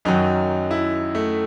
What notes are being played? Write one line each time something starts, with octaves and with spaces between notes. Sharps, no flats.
F#2 D#3 F#3 D#4
E4
A3